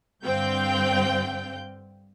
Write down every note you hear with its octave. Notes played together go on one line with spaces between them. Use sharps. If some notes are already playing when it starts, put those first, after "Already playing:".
G2 D3 C4 F5 G5 G6